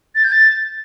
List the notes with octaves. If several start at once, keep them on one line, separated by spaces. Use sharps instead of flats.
A6
G6
A6